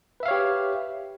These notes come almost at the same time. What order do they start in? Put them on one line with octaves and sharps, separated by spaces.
B4 E5 F5 C#5 G4